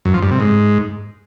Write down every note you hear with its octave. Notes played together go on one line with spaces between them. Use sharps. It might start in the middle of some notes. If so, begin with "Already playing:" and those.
F#2
F3
G2
C3
G#2